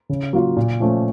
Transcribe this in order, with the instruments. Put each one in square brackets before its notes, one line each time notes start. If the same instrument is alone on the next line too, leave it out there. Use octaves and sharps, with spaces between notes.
[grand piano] C#3
F#3 A#3 F4
A#2
F3 A3 C#4